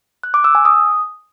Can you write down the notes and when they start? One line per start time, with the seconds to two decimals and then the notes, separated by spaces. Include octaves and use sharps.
0.23 F#6
0.34 D6
0.44 E6
0.55 G#5
0.65 D#6